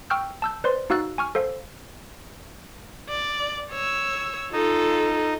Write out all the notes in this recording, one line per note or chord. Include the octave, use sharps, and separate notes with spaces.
G5 C#6 E6 F6 G6
A5 E6 G6
B4 C5 D5 C6
D#4 F#4 F5 E6 F#6 A6
G#5 C#6 F6
A4 C5 F5
D5
C#5 E6
D#4 F4 A4